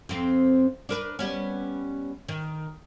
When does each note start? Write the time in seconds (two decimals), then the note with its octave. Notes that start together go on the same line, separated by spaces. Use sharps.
0.09 F2 C4
0.89 D4 A#4 B4
1.19 G3 B3 C#4
2.28 D#3